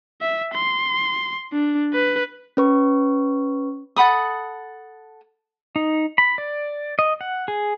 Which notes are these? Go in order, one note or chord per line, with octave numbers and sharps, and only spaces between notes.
E5
C6
D4
B4
C#4 B4 C#6
A4 F#5 B5 D#6
D#4
B5
D5
D#5
F#5
G#4